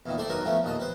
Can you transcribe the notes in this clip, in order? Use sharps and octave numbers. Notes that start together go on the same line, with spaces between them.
E2 A#2 D#3
A3 A4 C5 D5
D#3 F#3 A#4 B4
F3 A3 B3 C#4
D#2 A#2 D#5 A5
B4 C5